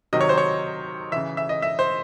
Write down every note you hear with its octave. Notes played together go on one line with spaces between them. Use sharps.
C3 D#3 F#3 D#5
C#5
C5
C#5
C#3 E3 E5
E5
D#5
E5
C5